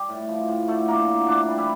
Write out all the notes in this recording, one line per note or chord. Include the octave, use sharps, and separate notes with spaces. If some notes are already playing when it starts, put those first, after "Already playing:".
Already playing: G3 G4
A2
F3
A2
D3 A3 A4
F3 A#3 A#4
D3
A2 D4 D5
G3
E3 E4